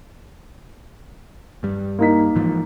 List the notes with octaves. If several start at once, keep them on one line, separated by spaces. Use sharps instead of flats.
G2 G3
A#3 D#4 B6
G#2 E3 F3